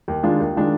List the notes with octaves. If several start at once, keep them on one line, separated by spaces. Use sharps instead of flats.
D#2
D#3 G#3 D4 F4
D#2
D#3 G#3 D4 F4